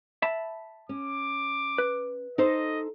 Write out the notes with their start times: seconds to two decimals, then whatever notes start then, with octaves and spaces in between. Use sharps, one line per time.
0.22 E5 A5 B5
0.89 C#4 D6
1.78 B4
2.38 D#4 A4 C5 D#5